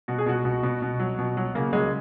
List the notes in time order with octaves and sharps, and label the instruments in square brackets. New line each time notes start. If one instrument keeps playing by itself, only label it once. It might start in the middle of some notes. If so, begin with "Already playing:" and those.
[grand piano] B2 F#4
G#4
B2 F#4
B2
B2
B2
F#3
B2
F#3
C#3 A#3
F#3 G#3